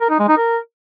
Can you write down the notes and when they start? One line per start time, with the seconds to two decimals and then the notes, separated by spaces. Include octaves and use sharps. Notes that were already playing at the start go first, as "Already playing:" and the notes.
0.01 A#4
0.10 D#4
0.19 G#3
0.28 D#4
0.38 A#4